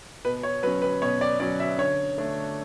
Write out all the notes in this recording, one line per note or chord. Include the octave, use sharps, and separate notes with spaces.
B2 B4
C#5
F#3 C#4 B4
B4
B2 C#5
D5
F#3 C#4 D5
E5
D3 C#5
A3 D4